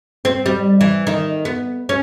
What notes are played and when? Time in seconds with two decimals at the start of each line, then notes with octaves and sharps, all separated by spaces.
0.25 C4
0.46 G3
0.81 E3
1.07 D#3
1.45 B3
1.89 C#4